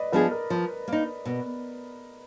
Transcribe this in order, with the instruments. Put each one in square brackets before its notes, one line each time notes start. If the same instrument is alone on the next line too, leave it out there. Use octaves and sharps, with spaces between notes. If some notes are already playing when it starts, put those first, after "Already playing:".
Already playing: [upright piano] B4 D5 D#5
[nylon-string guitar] F3 B3 D4 G#4 [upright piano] B4
[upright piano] A#4
[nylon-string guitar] F3
A#3 D#4
B2